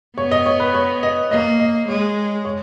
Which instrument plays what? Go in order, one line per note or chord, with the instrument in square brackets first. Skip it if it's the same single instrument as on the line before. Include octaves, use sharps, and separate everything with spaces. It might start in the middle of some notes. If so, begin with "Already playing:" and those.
[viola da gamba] B3 [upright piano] C#5
[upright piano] D#5
C#5
B4
C#5
D#5
[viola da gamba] A#3 [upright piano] D#5
[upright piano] D#5
[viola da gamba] G#3 [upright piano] C#5
[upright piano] C#5